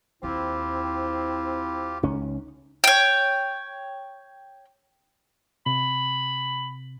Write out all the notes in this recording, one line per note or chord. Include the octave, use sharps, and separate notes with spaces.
D#2 C4 E4 F4 G4
C#2 C#4 D#4
C#5 G5
C3 B5